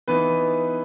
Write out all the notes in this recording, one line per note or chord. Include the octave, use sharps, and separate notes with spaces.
E3 B3 D#4 B4